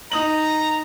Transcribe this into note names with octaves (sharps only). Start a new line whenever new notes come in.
D#4 A#5 D#6 F#7